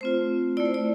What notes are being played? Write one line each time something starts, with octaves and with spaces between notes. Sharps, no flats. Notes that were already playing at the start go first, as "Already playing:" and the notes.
A3 C4 F4 C5
A3 E4 D5
C5
D5